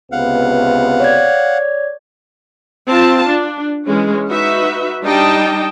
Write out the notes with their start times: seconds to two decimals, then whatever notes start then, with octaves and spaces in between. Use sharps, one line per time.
0.12 C#2 C3 B3 F5 F#5
1.00 C#5 D5 G#6
2.89 C4 F4 A5
3.30 D4
3.86 E3 G#3 C#4
4.29 D#4 F#4 B4 E5
5.03 G3 D4 D#4 D#5 G5 A5